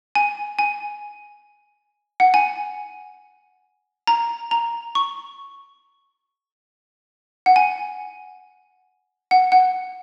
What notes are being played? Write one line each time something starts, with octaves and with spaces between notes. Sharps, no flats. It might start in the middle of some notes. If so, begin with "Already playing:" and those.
G#5
G#5
F#5
G#5
A#5
A#5
C#6
F#5
G#5
F#5
F#5